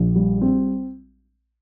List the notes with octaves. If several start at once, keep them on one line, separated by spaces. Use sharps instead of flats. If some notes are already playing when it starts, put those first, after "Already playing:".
Already playing: A#1
G3
C4